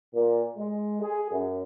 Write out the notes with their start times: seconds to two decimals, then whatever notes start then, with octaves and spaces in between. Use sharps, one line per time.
0.15 A#2
0.57 G#3
1.02 G#4
1.31 F#2